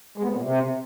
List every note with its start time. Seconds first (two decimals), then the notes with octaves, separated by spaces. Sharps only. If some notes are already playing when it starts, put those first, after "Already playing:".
0.18 G#3
0.24 B3
0.30 C3
0.36 A#2
0.42 C3